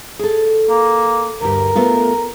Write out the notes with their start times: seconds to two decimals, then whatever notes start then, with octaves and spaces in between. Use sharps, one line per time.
0.19 G#4 A4
0.69 A#3
1.41 D2 G2 G4 A#4
1.75 A3 B3 F4